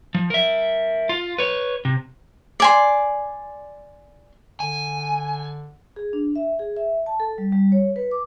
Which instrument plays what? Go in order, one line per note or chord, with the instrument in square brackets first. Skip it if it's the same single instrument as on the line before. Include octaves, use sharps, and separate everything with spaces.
[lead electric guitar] F3
A#4 E5
F4
B4 C#5
C3
[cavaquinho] D5 G#5 C6
[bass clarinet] D3 [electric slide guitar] G#5
[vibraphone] G#4
D4
E5
G#4
E5
A5
A4
G3
G3
C#5
B4
D6